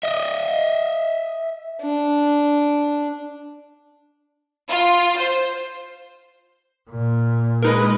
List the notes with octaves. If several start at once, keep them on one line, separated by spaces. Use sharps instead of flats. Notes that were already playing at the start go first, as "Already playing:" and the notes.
D#5 E5
D4
F4
C5
A#2
G#3 D#4 A#4 B4 D#5